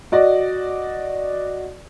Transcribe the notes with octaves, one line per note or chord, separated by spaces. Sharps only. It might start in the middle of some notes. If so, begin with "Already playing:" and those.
F#4 D5 D#5